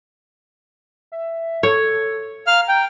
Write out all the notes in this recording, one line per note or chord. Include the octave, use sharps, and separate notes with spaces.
E5
A4 C#5
F5 A#5 F6
G5